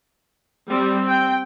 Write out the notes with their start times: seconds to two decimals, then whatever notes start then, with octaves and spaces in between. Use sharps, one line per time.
0.70 G3 C4
1.08 G5